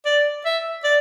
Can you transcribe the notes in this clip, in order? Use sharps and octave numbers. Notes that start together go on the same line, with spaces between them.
D5
E5
D5